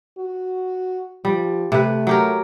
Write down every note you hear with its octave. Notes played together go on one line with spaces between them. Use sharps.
F#4
F3 G3
C3 A3 B4
F#3 G4 A#4